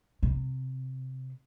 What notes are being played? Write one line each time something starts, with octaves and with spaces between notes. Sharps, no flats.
C3